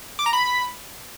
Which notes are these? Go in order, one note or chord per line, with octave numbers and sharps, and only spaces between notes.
D6
A#5
B5